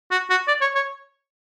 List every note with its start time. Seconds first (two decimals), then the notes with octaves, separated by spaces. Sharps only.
0.11 F#4
0.30 F#4
0.48 D5
0.61 C#5
0.75 C#5